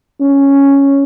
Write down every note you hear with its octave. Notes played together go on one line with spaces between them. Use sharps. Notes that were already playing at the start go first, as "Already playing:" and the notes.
C#4